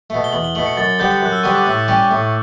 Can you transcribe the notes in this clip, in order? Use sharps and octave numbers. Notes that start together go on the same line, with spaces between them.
B2 A3
G7
E2 F#7
G7
B2 A3 F#7
C#7
F#2 A6
D3 G3 B3 D4 G6
F#2 F#6
E6
D3 G3 B3 D4 C#6
D6
A2 E6
G3 C#4 G4
A2